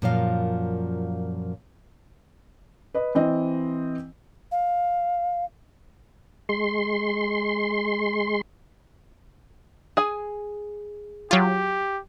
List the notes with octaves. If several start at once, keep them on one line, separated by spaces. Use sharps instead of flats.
F#2 A#2 F3 F5
B4 D#5
E3 C4 D#5
F5
G#3 C6
G#4 G#5
F#3 F4 G4